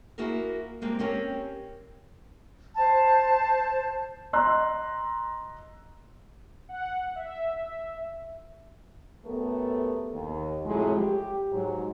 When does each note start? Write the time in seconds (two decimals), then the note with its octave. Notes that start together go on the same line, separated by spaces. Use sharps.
0.18 A#3 E4 F#4 G#4 A#4
0.82 G#3 A#3 C4 G4
0.99 C4 C#4 G4 A#4
2.77 C5 A5
4.33 D#5 A#5 C6 E6 F#6
6.69 F#5
7.16 E5
9.25 F#2 A3 B3 G4 A4 A#4
10.13 D#2
10.65 A2 C3 F3 F#3 G#3
10.96 G4
11.52 G#2 F#3